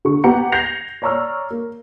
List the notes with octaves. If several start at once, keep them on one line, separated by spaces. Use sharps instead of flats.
D3 C#6
B3 G4 F#5 A#5 C#7
G6 G#6 A#6 C7 C#7 F7
C#5 D5 A#5 C#6 E6 F6
A#3